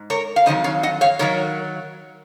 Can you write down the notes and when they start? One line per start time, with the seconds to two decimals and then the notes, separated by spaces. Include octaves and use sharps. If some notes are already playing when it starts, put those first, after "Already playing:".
Already playing: G#2
0.10 A#4 C#5
0.36 F5
0.46 F2 D#3 F#3 C5 D#5
0.64 C#5 F5
0.83 D#5 F#5
1.01 C#5 F5
1.19 D#3 F#3 A#4 C#5